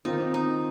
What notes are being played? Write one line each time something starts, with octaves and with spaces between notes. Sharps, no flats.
D#3 C4 D#4 F4
D#4